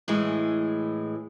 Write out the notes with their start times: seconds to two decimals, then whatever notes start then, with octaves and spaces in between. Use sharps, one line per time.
0.08 A2 E3 G#3